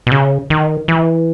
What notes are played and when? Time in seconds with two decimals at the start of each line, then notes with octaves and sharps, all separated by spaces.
0.07 B2
0.12 C#3
0.50 D#3
0.88 E3